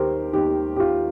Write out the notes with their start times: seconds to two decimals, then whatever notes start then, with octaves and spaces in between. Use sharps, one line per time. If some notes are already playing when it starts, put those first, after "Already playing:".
Already playing: D#2 D#3 G4 A#4 C5
0.33 D#2 D#3 G4
0.76 G4
0.80 F4